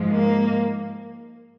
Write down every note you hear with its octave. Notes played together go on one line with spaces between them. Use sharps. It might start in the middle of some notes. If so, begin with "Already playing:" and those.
Already playing: G#2 F3 G#3
A#3